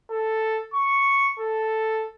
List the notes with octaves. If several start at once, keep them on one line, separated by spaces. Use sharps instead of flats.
A4
C#6
A4